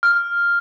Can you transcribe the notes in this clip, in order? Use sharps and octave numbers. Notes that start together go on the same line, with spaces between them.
F6